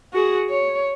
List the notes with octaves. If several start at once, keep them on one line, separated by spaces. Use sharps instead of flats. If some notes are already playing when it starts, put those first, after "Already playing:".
F#4 G#4
C#5